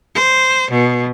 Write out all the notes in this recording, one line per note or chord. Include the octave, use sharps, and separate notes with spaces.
C5
B2